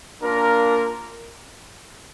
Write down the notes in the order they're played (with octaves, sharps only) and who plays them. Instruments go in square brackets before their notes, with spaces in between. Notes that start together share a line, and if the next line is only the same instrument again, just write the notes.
[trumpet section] A#3 D4 F4 A#4